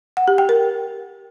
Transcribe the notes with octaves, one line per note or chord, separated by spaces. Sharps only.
F#5
G4
G5
A#4